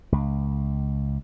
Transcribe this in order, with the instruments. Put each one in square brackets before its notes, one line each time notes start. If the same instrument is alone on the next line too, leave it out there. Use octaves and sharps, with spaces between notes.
[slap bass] C#2